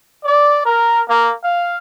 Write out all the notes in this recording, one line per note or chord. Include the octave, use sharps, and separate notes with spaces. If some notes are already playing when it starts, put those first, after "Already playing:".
D5
A#4
A#3
F5